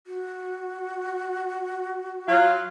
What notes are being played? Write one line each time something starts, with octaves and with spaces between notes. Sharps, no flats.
F#4
F#3 F4